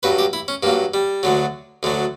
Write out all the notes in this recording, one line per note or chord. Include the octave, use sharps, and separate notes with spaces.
G2 F#3 B4
G4
E4
C#4
G2 F#3 A#3
G3
D2 D3 F#3
D2 D3 F#3